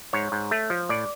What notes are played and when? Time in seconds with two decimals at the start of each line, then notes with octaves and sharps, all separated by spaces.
0.13 G#2 C#5
0.32 G#2
0.51 A3
0.70 F3
0.89 A2 D5